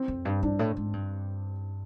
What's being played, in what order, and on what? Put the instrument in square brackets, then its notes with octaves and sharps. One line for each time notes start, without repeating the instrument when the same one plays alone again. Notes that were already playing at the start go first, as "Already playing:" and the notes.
Already playing: [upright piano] C4
[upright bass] F2
G2
[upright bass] G2 [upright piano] D4
[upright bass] A2
G#2
G2